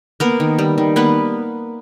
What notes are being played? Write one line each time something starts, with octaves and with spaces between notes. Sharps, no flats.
A#3 B3 A#4
D#3
G3
D#3
A#3 B3 B4